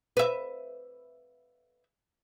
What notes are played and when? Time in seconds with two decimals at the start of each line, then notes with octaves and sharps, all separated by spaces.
0.17 B4 E5